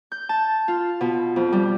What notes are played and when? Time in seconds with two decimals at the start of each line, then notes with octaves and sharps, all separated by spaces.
0.12 G6
0.29 A5
0.68 F4
1.01 B2
1.36 F2
1.53 G3